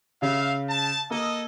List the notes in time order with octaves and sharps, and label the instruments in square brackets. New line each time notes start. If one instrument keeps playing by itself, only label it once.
[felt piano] C#3 [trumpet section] E5 F5
[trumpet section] A5
[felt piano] A#3 [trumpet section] A4 D#5